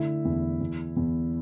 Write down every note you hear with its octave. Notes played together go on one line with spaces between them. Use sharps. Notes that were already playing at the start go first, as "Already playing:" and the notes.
Already playing: D3 A3 E4 E5
E2
E2
E2